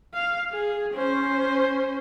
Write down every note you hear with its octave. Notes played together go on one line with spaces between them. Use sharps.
F5
G#4
C#4 C5